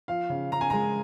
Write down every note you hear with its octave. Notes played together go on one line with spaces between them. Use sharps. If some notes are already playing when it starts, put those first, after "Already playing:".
F3 F5
C#3
C#3 A#5
G#5
G#3 A#5